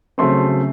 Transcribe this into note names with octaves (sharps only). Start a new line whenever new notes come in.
C#3 F#3 A3 C4 C6